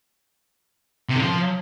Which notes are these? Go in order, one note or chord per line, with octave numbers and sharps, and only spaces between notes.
C3
D3
F3